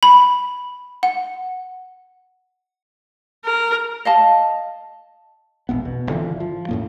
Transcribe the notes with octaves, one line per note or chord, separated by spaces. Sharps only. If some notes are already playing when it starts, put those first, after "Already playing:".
B5
F#5
A#4
D#5 F5 A5
E1 A#1 B3
B2
G#1 D3 E3 F3
F3
F#2 A2 A#3